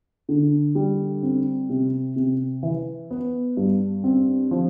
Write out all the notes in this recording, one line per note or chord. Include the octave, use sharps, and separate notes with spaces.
D3
G3
C4
C3
C3
E3
B3
G2
C4
F3